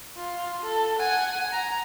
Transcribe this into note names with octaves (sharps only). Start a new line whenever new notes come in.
F4
A4
F#5 G#5
A#5